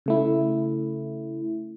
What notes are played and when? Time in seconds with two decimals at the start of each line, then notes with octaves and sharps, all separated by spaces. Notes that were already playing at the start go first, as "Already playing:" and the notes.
0.06 C#3 A3 E4